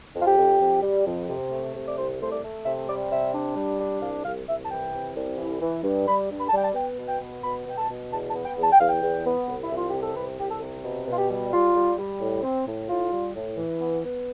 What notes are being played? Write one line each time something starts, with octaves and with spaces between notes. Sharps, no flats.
F2
F4
G4
F2
F2
G3
F2
C3
A3
C3
D5
C2 C5
A3 C5
D5
A3
C3 E5
G3 D5
C3 E5
D4
G3
D4
C2 F5
C2 F5
C2 E5
A5
E3 G5
C3
C2
E3
E3
G2
G3 B5
G2
B5
A5
G3 G5
A5
B3 G5
B2
G5
B3
B2 B5
B2 G5
A5
B2
E2 A5
A5
B3
G5
E2
A5
G5
E2 F5
G5
E2
B3
C2
E4
C2
F4
C3 G4
A4
C2 B4
C2 G4
A4
C3
B2
B2
F4
G4
G3
G3 F4
G3
G3
A2
C4
A2
A2 F4
G3
A2
E3
B3
B3